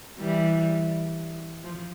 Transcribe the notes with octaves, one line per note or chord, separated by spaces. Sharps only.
E3 G3
F3